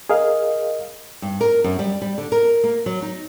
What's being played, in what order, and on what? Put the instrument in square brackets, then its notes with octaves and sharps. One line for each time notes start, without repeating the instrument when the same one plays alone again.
[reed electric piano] G#4 A#4 D#5 F5
[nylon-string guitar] G2
A#4
F#2
G3
G3
D3
A#4
A#3
F#3
D#4